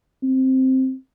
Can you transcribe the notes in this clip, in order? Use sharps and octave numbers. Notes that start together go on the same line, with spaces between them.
C4